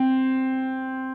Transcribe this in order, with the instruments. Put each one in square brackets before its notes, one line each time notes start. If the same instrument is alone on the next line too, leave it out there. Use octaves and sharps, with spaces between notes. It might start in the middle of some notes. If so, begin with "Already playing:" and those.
Already playing: [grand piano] C4